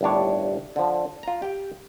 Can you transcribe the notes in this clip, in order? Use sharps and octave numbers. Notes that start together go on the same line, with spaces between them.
G1 D#2 A2 D4 C#5
D3 F3
F4 A#5
G4 G5